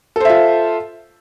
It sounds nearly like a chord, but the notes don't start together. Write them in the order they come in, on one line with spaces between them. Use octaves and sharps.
A4 C5 E5 F4